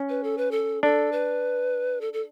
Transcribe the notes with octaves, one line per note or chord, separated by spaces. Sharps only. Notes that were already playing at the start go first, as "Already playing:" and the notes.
Already playing: C#4
B4
A4
B4
A4
D4 A4
B4
A4
A4